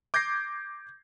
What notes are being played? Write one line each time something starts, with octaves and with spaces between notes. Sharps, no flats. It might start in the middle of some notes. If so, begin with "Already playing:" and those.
D6 G6 G#6 A#6 C7